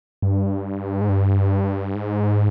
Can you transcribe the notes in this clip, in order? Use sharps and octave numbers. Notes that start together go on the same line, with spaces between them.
G2
G#2
G2
G#2